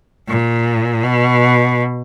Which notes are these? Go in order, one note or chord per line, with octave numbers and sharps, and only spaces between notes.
A#2
B2